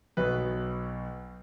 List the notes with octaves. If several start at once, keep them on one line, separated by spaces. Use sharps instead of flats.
B1 B2 B4